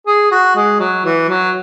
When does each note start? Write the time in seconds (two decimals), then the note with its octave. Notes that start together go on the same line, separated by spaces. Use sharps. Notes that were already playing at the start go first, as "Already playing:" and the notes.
0.07 G#4
0.31 F#4
0.56 G#3
0.80 F#3
1.05 E3
1.29 F#3